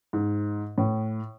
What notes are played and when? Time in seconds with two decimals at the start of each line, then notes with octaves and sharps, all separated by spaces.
0.13 G#2
0.78 A2